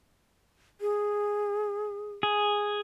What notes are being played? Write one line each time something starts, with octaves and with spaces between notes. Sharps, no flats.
G#4
G#4